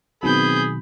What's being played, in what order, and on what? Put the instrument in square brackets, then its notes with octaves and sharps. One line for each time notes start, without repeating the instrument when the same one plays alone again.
[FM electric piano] B2 D#3 F#3 [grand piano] B3 C4 [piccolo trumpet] G#4 [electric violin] B5 G6